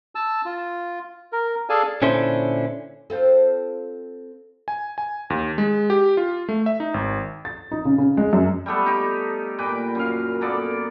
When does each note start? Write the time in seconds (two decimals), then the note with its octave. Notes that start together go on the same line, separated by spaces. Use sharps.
0.15 A5 E6
0.45 F4
1.33 A#4
1.69 G#4 A4 D5 F5 G#5 A5
2.02 A#2 D3 C#4 D4 E4 C5
3.10 C4 F4 A4
4.68 G#5
4.98 G#5
5.30 D#2
5.58 G#3
5.90 G4
6.17 F4
6.49 A3
6.66 E5
6.80 D#4
6.94 G#1
7.45 A6
7.71 D#4
7.85 C#3
7.98 C#3
8.17 G#3
8.33 F#2
8.66 G3 A3 B3 A4
8.86 D#4 G4
9.58 A#2 B4 G5 D6
9.95 F#2 F5
10.41 A#3 B3 A4 D5